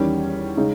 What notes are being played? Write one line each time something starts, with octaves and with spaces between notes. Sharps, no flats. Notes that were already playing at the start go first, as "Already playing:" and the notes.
Already playing: E2 D#3 G3 C#4
C#3 G#3 D#4